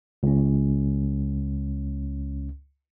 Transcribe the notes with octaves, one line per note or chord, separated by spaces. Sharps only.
C#2 C#4